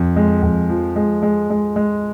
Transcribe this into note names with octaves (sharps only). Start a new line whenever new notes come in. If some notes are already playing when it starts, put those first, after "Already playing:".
Already playing: F2
G#3
F2
F3
G#3
G#3
G#3
G#3